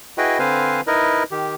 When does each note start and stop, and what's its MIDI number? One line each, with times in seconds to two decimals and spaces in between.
0.18 0.38 64
0.18 0.38 66
0.18 0.38 68
0.18 0.38 71
0.18 0.38 75
0.18 0.38 79
0.39 0.81 50
0.39 0.81 60
0.39 0.81 71
0.39 0.81 72
0.39 0.81 77
0.39 0.81 80
0.87 1.23 63
0.87 1.23 64
0.87 1.23 70
0.87 1.23 71
0.87 1.23 75
1.31 1.55 51
1.31 1.55 67